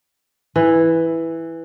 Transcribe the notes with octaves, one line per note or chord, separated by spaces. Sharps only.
E3